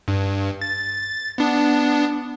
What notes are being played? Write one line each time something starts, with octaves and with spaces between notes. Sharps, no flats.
G2
A6
B3 D4